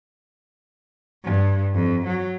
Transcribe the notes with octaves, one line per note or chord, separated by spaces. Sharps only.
G2
F2
F#3